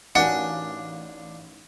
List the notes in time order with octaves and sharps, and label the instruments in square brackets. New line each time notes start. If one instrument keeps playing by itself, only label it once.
[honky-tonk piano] A1 A#4 F5 [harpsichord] D4 [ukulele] D#4 F#4 G#5 [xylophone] F#5